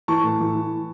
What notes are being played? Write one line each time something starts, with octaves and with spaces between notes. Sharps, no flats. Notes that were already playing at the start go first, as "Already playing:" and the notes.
E3 A5 C#6
A2
E3
E3